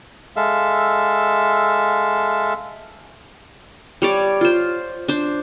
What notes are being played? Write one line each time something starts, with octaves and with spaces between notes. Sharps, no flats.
G#3 A4 E5 F5 E6
G3 C#5 D5
F4 C5
D4 C5